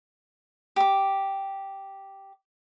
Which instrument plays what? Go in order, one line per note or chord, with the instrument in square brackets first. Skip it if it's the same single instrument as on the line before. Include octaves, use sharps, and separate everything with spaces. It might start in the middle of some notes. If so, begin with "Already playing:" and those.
[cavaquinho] G4 D6